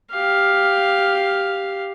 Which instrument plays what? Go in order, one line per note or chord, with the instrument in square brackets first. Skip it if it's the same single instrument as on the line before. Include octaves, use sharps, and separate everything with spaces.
[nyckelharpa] G4 F5